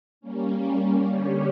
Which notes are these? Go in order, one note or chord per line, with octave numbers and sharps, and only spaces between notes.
G3 A#3 C#4
D3 G3 C#4 G4 C#5